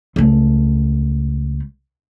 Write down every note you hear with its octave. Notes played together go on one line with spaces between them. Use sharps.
C#2 A3